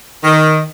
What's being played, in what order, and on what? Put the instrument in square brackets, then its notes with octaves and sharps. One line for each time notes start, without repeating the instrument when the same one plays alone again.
[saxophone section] D#3